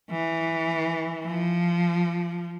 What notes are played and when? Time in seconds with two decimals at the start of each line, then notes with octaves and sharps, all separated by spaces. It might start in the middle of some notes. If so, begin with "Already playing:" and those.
0.11 E3
1.25 F3